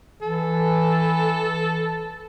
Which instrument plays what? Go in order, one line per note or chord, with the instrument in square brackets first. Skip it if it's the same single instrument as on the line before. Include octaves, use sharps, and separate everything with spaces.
[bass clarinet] E3 [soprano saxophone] A4